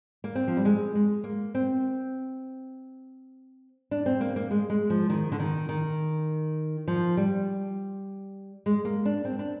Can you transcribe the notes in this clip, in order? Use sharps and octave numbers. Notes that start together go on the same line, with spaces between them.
A#3
C4
F3
G3
G#3
G#3
A#3
C4
D4
C4
A#3
A#3
G#3
G#3
F3
D#3
D3
D#3
D#3
F3
G3
G#3
A#3
D4
C4
D4